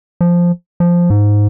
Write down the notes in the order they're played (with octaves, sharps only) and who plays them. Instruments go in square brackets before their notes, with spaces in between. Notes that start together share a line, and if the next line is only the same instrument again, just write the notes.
[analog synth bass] F3
F3
G#2